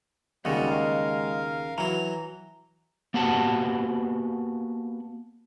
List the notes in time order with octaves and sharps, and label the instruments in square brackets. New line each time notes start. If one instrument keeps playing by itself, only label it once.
[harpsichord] D#2 C#3 [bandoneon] G3 F#4 D5 [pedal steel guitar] G#3 D#5 F#5
[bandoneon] A#4 F5
[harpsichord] E3 F#3 [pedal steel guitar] A#5
[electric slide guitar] A#3 B3 F#4 G4 F#5 A5